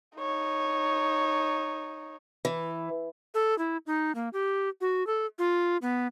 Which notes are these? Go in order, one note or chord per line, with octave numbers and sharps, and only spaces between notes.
D#4 C#5
E3
A4
E4
D#4
A#3
G4
F#4
A4
F4
B3